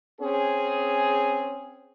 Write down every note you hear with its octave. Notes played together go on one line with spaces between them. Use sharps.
C4 C#4 G#4